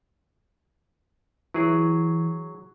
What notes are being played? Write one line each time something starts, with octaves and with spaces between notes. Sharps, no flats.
E3 F#3 G#4